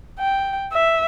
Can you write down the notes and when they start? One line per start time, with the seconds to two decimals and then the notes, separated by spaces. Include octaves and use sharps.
0.19 G5
0.72 E5